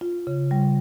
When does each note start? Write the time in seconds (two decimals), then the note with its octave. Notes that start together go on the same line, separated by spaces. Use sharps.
0.01 F4
0.27 C#3
0.51 G3